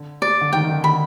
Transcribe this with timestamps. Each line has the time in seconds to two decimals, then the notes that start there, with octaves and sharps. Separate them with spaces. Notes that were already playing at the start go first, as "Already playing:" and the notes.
Already playing: D3
0.22 D5
0.41 D3
0.53 D#3 G5
0.63 D#3
0.69 D3
0.84 D3 B5